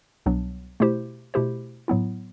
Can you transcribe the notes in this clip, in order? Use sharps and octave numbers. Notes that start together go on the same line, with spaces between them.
C2 B2 F#3 B3 D4
B2 A3 E4 G4 C5
B2 A3 E4 G4 C5
A2 F#3 B3 E4